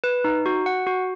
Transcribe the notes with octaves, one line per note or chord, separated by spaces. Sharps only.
B4
D#4
F#4
F#5
F#4